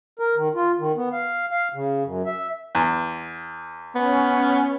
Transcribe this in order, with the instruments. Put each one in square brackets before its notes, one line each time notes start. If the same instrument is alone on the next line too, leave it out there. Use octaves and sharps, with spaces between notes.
[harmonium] A#4
D#3
F4
D#3
B3
F5
F5
C#3
F#2
E5
[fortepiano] E2
[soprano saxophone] B3 [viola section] C#4